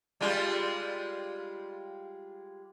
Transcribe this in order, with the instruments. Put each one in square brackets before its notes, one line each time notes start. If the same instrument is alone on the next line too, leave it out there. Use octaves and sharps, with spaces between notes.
[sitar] G3 G#3 F4